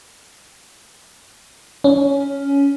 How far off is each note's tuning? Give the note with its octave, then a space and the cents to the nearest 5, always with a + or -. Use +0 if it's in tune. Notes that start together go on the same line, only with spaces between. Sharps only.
C#4 +15